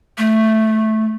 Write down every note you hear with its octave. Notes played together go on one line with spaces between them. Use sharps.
A3